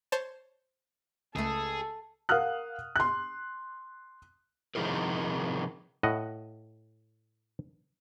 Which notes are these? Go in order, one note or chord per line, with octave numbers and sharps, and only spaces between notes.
C5 C#5 A5
C#2 A3 G#4 A4
A#4 F5 F#5 D#6 F6 F#6
C6 F#6
C3 D#3 F3 E4 G#4 A#4
A2 D#5 F#5